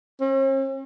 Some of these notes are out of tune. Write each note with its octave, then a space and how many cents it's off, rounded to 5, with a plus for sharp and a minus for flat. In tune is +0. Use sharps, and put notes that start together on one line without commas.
C#4 -45